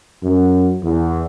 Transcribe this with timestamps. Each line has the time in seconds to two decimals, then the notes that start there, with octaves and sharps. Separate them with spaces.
0.22 F#2
0.83 E2